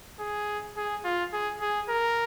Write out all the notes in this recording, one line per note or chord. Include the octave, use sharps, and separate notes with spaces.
G#4
G#4
F4
G#4
G#4
A#4